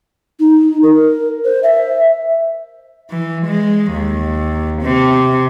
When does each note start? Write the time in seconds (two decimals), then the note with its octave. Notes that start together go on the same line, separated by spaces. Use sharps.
0.40 D#4
0.82 A#4
1.45 C5
1.63 E5
3.10 E3
3.47 G#3
3.92 D#2
4.82 C3